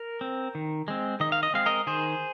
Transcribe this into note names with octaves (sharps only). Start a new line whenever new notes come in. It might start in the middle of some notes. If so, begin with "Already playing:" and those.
Already playing: A#4
C4
D#3
G#3 C4
D#3 D#5
F5
D#5
G#3 C4 F5
A#4 D#5
D#3 G#4 C5